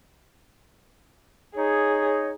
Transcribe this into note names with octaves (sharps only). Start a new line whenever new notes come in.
D#4 G#4 C#5